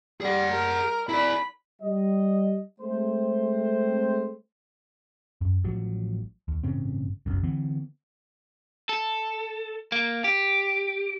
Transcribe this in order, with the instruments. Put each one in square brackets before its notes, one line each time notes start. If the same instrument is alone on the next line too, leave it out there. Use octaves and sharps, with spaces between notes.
[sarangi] G3 [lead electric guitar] G#4 F#5
[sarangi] A#4
[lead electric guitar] E4 D5 [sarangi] B5
[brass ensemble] G3 D#5
G#3 A3 C4 C5
[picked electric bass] F#2
A1 F3 F#3
D#2
A1 G2 C#3 C4
F1 B1 F#2
D3 E3 B3 C4
[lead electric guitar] A4
A#3
G4